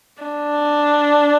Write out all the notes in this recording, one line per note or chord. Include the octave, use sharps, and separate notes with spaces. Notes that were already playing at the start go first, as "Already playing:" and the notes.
D4